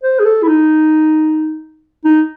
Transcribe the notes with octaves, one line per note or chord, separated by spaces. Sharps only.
C5
G#4
A4
E4
D#4
D#4